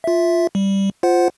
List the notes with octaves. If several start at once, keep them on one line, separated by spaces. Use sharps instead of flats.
F4 E5
G3
F4 C5 F#5